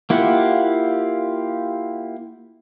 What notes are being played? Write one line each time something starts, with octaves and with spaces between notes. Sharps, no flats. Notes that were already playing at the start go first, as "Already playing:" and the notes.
A#3 E4 F4 G4 F#5